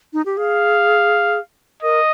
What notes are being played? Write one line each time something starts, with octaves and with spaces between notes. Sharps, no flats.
D#4
G4
G#4 F5
A#4 D#5